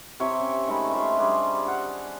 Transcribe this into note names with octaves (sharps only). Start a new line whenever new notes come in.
C3 C#5 E5 G5
C#4
D#3 G#3 A3 B5
F4 C5 E5 F5
G3 D4 G#4
F5 F#5